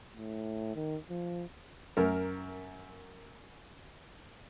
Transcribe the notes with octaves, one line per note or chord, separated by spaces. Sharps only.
A2
D#3
F3
F#2 A#4